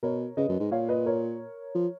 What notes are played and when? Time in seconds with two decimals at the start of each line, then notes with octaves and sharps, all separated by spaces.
0.03 B2 A#4 C#5
0.37 C#3 B4 D#5
0.49 F#2
0.60 G#2
0.71 A#2 C#5 F5
0.89 B4 D#5
1.06 A#4 C#5
1.75 F3